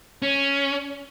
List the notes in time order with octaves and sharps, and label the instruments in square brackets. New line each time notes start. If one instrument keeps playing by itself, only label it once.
[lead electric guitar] C#4